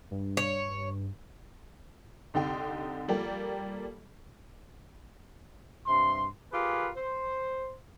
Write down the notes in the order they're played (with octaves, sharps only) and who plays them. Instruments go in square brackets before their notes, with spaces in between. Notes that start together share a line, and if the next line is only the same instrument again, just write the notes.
[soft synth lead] G2
[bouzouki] C#5
[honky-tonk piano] C2 D3 D#4 G4 G5 C6
F3 G3 A#3 G4 A4 D5
[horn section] G2 C3 C6
F4 G4 G#4 A#4 B4
C5